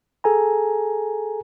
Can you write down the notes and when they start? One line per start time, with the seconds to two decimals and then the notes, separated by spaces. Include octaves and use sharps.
0.24 G#4 A4 G#5 A#5